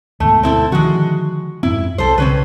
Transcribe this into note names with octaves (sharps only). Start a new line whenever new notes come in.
D2 G#2 B2 A3
C4 E4 A4
D3 D#3 F3 G#3 F#4
F2 G#2 C4 E4
B1 A4 C5
C2 C#3 C4 C#4 B4